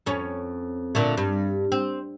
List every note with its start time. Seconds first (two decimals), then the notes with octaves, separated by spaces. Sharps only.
0.06 F2 C#4
0.95 A#2 D3 A3
1.17 G2
1.72 C4